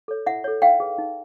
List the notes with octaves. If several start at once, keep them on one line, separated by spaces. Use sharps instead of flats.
A4 C#5
E4 E5 F#5
A4 C#5
D#4 F5 G5
G#4 B4
D#4